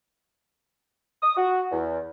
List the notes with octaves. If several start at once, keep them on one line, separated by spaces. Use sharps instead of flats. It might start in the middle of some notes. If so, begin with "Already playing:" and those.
D#6
F#4
E2